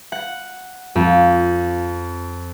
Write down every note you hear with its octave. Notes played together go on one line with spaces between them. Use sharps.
F#5
F2